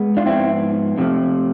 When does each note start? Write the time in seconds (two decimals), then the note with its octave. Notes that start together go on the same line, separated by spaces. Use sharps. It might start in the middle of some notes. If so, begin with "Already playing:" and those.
Already playing: G#3 B3
0.17 D4 F4
0.26 G#2 F3 B3 C4 E4
0.98 F2 C3 F3 A3